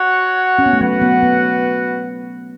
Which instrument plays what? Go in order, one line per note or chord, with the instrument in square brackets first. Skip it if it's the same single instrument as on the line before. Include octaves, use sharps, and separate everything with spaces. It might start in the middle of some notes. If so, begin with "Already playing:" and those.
Already playing: [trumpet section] F#4 C#5 F#5
[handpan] C#4
B3
A3
[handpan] F#3 [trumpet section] F#4 B4 F#5
[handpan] B3
B3